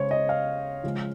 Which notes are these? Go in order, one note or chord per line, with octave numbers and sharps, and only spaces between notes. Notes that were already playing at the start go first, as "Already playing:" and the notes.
Already playing: C#3 G#3 C5 C#5
D#5
F5
C#3 F3 G#3